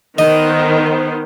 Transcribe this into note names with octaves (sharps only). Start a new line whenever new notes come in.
D#3 B3 C5 D#5